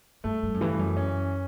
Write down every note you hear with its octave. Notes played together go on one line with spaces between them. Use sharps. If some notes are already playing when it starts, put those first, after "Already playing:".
G2 A3
G2
F#2
G2 E3
F#2
C#4